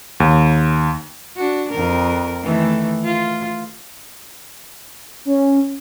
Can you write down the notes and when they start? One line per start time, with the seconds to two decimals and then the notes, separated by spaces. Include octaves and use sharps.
0.20 D#2
1.37 D4 F#4
1.71 F2 A#4
2.43 D#3 E3 A3
3.05 F4
5.25 C#4